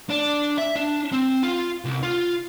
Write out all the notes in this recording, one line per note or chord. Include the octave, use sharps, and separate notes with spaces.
D4
E5
D4
C4
F4
C2
F4